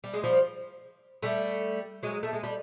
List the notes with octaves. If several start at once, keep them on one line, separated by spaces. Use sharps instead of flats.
G3
G#3
F3 G3
G3 A3
F#3 G#3
A3
G#3
G3